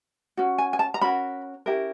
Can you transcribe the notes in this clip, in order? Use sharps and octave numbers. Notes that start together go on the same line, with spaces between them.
C#4 F#4
G#5
G#5
A5
A#5
C#4 F#4 A#4 B5
C#4 E4 G4 A#4